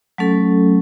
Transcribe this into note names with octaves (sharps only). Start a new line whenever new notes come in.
F#3 A3 C#4 A4